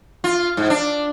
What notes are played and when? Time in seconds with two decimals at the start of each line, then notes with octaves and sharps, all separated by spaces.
0.24 F4
0.57 G#2
0.70 D4